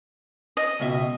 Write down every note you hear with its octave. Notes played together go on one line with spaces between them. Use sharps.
D#5
C#2 B2 E5